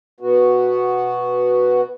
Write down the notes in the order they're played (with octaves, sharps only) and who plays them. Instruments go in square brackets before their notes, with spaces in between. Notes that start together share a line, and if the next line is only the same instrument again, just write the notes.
[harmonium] B2 B3 F#4